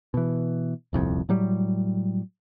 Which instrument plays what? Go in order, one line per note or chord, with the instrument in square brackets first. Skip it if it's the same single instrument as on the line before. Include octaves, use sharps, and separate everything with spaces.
[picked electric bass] B2 E3
D#1 C2 F2
A2 F#3 G3